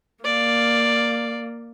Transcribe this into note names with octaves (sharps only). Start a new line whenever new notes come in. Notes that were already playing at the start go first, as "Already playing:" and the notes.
A#3 D5 F5